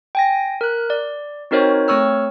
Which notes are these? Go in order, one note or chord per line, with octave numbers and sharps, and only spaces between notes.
G5 G#5 A#6
A#4 F#6
D5
C4 D#4 F#4 A#4 C5 C#5
A3 C4 C#5 C#6 E6 F6